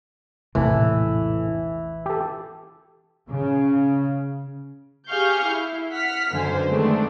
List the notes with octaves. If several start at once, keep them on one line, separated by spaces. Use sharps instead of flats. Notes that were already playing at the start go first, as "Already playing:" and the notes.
A#1 E2 A2 C3 E3 A4
G4 A4
C#3
G4 G#4 F5 C#6 F6 G6
E4
F#5 F6 B6
B1 F#2 D3 C5 G#5
D#3 G#3 A3 B3 C4 D4